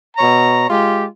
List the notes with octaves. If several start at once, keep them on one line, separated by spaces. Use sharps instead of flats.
B2 C#5 A#5
G#3 F4 G4